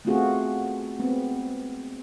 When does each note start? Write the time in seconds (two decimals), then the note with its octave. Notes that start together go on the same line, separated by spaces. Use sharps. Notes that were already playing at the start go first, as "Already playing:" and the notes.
0.05 A3 B3 C4 F4 F#4 G#4
0.99 G#3 B3 C4